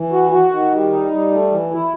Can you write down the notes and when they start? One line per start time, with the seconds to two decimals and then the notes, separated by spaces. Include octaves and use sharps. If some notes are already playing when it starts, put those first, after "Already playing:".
Already playing: E3
0.12 F#4
0.32 F#4
0.52 D#3
0.72 G3
0.91 D#4
1.11 G3
1.32 A3
1.51 E3
1.71 E4